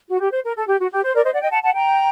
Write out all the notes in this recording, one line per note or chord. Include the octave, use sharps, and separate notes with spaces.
F#4
G4
C5
A#4
A4
G4
F#4
G4
C5
A#4 D5
C5 D#5
D5 F#5
D#5 G5
F#5 A5
F#5 A5
G5 A#5